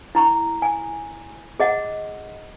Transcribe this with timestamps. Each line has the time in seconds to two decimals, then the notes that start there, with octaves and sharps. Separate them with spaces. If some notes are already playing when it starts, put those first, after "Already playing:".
0.15 E4 A#5 C#6
0.62 G#5
1.60 G#4 D#5 F#5